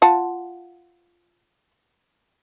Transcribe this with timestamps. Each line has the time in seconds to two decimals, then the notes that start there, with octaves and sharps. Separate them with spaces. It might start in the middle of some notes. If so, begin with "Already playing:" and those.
0.02 F4 F#5 A5